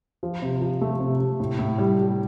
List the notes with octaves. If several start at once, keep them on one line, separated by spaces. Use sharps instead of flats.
F3
C3
F3
A3
C3
C3
A2
A2
G3
G3